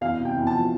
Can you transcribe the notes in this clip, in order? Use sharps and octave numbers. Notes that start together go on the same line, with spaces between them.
E2 F5
C3
G5
E2
A5
F3